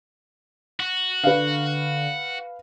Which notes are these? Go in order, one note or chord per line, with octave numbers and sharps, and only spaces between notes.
F#4
D3 B4 F5